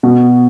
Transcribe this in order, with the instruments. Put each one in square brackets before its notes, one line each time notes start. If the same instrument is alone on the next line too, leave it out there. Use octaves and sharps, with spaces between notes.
[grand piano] B2